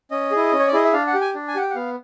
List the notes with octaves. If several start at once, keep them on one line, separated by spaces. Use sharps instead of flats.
C#4 D#5
E4 G#4
C#4
C#5
D5
E4 G#4 D#5
E5
D4 F5
F#5
G4
G#5
D4
G#5
G4 F#5
G5
F#5
B3 F5